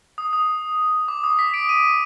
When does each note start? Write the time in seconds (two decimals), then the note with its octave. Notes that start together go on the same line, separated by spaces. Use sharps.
0.18 D#6
0.33 D#6
1.08 D6
1.24 D#6
1.39 B6
1.54 D7
1.69 D#7